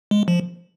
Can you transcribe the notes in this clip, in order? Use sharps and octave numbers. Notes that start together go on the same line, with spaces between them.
G#3
F3